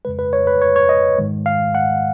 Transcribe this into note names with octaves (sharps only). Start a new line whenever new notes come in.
F2 C#3 G#3 B4
B4
C#5
B4
C#5
C#5
D#5
G#2 D#3 G#3
F5
F#5